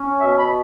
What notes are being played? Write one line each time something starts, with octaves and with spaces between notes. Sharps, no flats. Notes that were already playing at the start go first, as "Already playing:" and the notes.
Already playing: C#4
B2 E5
B5